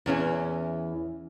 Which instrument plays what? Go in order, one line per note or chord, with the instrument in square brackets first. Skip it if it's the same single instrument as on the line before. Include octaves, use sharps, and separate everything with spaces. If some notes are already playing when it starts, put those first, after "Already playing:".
[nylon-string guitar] E2 C#4 E4